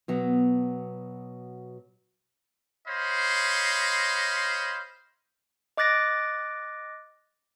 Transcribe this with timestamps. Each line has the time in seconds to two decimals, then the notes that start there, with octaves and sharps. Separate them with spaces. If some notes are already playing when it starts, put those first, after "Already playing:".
0.08 B2 F#3 B3
2.88 C5 C#5 D#5 F5 B5 C6
5.77 D#5 D6 F#6 A6 A#6 D7